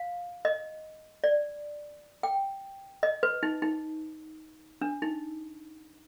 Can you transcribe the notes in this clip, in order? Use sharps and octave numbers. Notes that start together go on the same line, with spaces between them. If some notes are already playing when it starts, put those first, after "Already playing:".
Already playing: F5
D#5
D5
G5
D#5
B4
D#4
D#4
D4
D#4